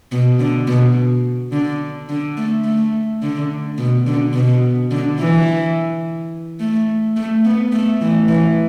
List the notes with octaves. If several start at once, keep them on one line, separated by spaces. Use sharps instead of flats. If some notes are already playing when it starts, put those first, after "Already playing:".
B2
D3
B2
D3
D3
A3
A3
D3
B2
D3
B2
D3
E3
A3
A3
B3
A3
E3
E3